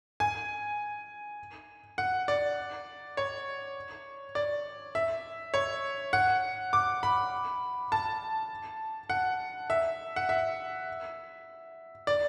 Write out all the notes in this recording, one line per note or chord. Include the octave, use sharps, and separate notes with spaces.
G#5
F#5
D5
C#5
D5
E5
C#5
F#5
D6
B5
A5
F#5
E5
F#5
E5
D5